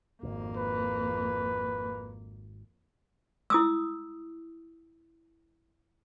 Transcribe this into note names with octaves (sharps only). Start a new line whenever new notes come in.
D1 G#1 F2 A#3
B4
E4 D#6 E6